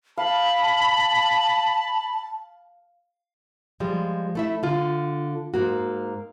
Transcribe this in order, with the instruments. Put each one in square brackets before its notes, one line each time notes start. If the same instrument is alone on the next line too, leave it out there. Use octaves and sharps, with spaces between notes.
[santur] F5 [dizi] A5 [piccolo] B5
[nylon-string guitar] F3 G3 G#3
A3 E4 E5
D3 F4
G#2 A#3 F#4